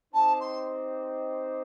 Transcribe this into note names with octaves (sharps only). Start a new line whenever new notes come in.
C4 D#4 G4 C5 D#5 A5
C6